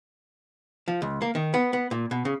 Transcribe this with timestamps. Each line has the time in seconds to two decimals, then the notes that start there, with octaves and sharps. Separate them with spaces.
0.88 F3
1.02 C#2
1.22 A#3
1.35 D#3
1.54 B3
1.73 B3
1.91 A#2
2.11 B2
2.25 C#3